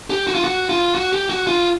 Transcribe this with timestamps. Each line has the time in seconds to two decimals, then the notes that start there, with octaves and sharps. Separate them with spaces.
0.10 G4
0.27 F#4
0.35 F4
0.44 F#4
0.69 F4
0.95 F#4
1.13 G4
1.30 F#4
1.47 F4